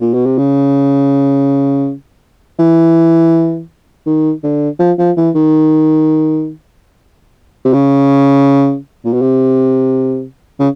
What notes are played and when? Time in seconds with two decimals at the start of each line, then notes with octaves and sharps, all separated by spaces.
0.01 A#2
0.14 B2
0.26 C3
0.38 C#3
2.59 E3
4.07 D#3
4.44 D3
4.80 F3
4.99 F3
5.17 E3
5.35 D#3
7.65 C3
7.74 C#3
9.05 A#2
9.13 B2
9.22 C3
10.60 C#3